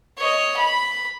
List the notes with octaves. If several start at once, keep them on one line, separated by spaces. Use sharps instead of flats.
C#5 D#5
B5